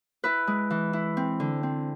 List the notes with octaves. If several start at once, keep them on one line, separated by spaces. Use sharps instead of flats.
E4 B4
G#3
E3
E4
C4
D3
C4